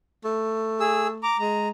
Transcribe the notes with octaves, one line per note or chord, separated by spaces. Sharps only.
A3
G#4 E6
A#5 D6
G#3 A#5